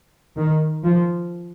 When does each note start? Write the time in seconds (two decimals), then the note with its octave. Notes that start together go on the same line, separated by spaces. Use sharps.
0.38 D#3
0.84 F3